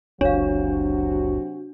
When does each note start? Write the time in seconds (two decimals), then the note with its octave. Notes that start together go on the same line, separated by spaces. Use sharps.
0.21 F#1 C#2 C3 F#3 D4 F#4 C#5 F5